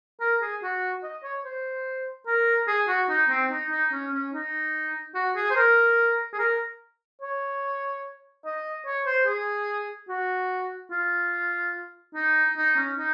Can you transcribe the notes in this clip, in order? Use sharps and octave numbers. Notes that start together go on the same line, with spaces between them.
A#4
G#4
F#4
D#5
C#5
C5
A#4
G#4
F#4
D#4
C4
D#4
D#4
C#4
C#4
D#4
F#4
G#4
C5
A#4
G#4
A#4
C#5
D#5
C#5
C5
G#4
F#4
F4
D#4
D#4
C#4
D#4